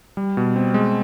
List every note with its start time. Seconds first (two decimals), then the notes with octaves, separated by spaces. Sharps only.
0.17 G3
0.37 B2
0.56 C4
0.74 G#3